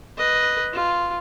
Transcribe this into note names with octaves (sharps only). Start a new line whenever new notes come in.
B4 D#5
F4